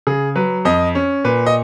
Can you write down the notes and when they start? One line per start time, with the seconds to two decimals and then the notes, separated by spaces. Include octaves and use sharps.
0.07 C#3 G#4
0.36 F#3 B4
0.65 F2 D#5
0.95 C#4
1.24 A#2 B4
1.46 D#5